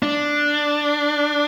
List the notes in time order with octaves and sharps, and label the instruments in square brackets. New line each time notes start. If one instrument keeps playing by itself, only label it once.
[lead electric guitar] D4